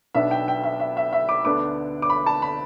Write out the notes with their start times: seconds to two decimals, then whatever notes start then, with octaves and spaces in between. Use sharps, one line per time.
0.15 B1 B2 B3 D4 E5
0.31 G5
0.48 G5
0.64 E5
0.80 E5
0.97 E5
1.13 E5
1.29 D6
1.45 D2 D3 B3 D4 D6
2.02 D6
2.10 B5
2.26 A5
2.42 B5